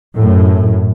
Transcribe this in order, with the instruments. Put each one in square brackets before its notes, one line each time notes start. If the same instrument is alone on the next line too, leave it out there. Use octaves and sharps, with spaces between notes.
[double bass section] F#2 A2